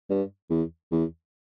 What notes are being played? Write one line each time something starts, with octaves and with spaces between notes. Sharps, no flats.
G2
E2
E2